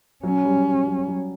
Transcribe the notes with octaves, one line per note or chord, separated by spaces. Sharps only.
F#3 C#4
G3
F#3
F#3